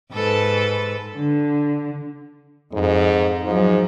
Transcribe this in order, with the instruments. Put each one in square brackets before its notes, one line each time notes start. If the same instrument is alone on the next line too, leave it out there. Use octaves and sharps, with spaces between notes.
[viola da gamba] G#2 A4 B4
[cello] D3
[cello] F2 [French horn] G#2
[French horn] G#2 [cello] F3 F#3